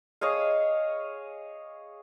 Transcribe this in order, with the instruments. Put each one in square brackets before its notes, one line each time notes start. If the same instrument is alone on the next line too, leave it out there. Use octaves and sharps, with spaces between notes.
[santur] G#4 C#5 D#5 F5